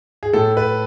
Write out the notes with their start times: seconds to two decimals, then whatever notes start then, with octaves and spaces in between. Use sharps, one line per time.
0.23 G#4
0.33 A2 A4
0.57 B4